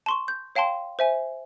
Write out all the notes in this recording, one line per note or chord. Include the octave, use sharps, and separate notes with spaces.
A5 C6 C#6
G6
C#5 F5 G5 A5 C6
C5 E5 G#5